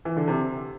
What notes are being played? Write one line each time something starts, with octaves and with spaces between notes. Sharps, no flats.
E3
D3
C3